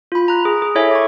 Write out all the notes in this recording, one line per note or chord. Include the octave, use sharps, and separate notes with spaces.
F4 B5
A#5 F#6
G#4
G#4
E4 A4 C#5 E5 G#5
C#6 D6